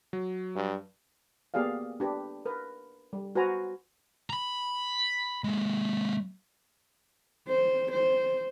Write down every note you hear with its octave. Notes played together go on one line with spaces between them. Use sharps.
F#3
G2
A#3 B3 G4 G#4 D5 F5
D4 G4 B4
A#4 B4
G3
F#4 B4 C5 G#5 A#5
A#5 B5
G#3 A#3
C5
C5